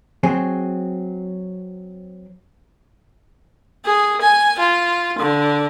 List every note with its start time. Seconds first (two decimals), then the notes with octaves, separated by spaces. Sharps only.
0.23 F#3 C4 G#4
3.85 G#4
4.21 G#5
4.59 F4
5.19 D3